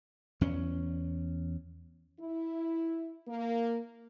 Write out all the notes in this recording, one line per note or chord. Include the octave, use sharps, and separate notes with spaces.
E2 C#4
E4
A#3